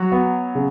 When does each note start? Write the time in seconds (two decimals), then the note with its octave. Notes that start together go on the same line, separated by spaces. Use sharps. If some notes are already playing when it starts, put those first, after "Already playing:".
Already playing: F#3 F#4
0.12 B3
0.55 C#3